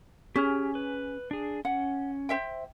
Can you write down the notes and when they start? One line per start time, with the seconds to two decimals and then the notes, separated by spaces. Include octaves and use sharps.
0.36 C#4 G4 G#4 F6
0.75 B4
1.31 D4 G#4
1.65 C#4 F#5
2.29 C5 E5 G5